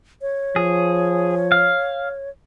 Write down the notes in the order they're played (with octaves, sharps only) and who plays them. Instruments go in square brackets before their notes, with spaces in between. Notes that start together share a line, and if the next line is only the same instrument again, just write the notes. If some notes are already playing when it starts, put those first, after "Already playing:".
[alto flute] C#5
[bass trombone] F3 [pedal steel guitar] G#4
[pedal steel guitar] F5